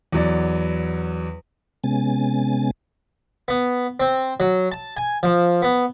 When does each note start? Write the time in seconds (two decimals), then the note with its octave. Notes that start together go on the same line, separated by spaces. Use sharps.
0.12 E2 F#3 D5
1.84 C3 G#3 B3 C#4 G#5 A6
3.48 B3
4.00 C4
4.40 F#3
4.72 A5
4.97 G#5
5.23 F3
5.62 B3